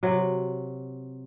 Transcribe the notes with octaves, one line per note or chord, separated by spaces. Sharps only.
C3 F#3